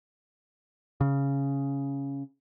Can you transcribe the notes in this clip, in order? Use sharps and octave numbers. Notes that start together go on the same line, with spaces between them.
C#3